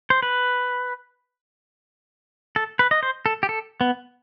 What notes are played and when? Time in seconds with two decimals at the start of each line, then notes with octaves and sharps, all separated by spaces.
0.10 C5
0.22 B4
2.56 A4
2.79 B4
2.91 D#5
3.03 C5
3.26 A4
3.43 G4
3.49 A4
3.81 B3